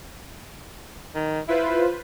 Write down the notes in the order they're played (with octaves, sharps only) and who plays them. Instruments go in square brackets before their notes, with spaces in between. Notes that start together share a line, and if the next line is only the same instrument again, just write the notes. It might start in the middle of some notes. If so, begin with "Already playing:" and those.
[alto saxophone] D#3
[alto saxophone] E4 [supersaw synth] F4 B4 C5